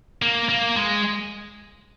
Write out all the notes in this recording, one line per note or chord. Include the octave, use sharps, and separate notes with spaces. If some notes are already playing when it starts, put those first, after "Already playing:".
A#3
A#3
G#3